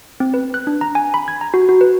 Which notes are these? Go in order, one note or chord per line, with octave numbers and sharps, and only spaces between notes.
C4
B4
F#6
D4
A#5
G#5
B5
G#6
A#5
F#4
F#4
B4